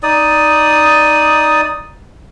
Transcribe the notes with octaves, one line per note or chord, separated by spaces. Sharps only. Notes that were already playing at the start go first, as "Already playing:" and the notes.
D#4 D5 D#6